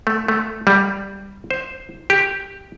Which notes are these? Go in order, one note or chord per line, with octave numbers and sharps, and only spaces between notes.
A3
A3
G3
C5
G4